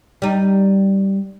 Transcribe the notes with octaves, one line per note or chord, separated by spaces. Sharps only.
G3 D#4